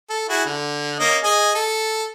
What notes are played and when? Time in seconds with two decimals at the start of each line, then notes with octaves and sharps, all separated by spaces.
0.10 A4
0.29 E4 F#4 G#4
0.45 D3
1.00 A#3 C#4 D#5
1.23 G#4 D#5 G#5
1.55 A4